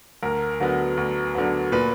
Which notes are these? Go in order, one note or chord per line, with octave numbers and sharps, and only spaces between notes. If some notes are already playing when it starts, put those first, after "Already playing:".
D2 A#4
D3 F#3 B3
D2
D3 F#3 B3
A#2 B4